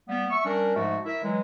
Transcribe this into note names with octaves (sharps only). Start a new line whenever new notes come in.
G3 A#3 B3
E5 C#6
G3 C#4 D4 A#4
G#2 F3 G#3 A3 F#4
E4 A#4 E5
E3 F#3 G#3